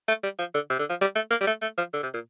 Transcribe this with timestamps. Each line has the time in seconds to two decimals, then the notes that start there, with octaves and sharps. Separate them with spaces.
0.08 A3
0.23 G3
0.39 F3
0.54 D3
0.70 C3
0.79 D3
0.90 F3
1.01 G3
1.15 A3
1.31 A#3
1.41 G3
1.47 A3
1.62 A3
1.78 F3
1.93 D3
2.03 C3
2.14 A#2